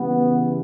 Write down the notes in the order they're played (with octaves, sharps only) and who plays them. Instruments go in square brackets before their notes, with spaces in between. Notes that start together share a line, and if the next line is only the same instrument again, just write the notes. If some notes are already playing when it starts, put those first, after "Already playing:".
Already playing: [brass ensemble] C#3 E3 G3 B3